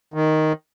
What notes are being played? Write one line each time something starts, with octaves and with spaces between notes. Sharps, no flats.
D#3